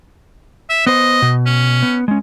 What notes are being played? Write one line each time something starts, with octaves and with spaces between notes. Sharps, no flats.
E5
B3 C5 D#5
B2
C#4
B3
G#3 C#4